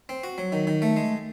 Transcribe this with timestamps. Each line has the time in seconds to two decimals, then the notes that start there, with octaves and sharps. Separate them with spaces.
0.09 C4
0.24 F#4
0.38 F#3
0.52 D#3
0.67 D#3
0.82 A3
0.97 G#3